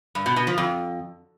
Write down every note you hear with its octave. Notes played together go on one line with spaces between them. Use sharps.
G2
B2
B2
F3
F2